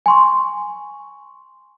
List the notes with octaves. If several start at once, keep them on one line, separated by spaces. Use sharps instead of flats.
G#5 C6 C#6